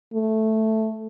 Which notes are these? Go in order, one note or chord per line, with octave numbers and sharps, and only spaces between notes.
A3